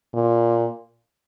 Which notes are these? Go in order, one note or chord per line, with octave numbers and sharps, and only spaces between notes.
A#2